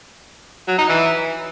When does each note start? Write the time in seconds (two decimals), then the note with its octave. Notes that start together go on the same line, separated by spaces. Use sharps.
0.68 F#3
0.78 D#4
0.89 E3